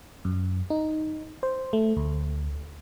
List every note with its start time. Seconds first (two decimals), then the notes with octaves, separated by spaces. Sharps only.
0.25 F#2
0.70 D#4
1.43 C5
1.73 A3
1.97 D2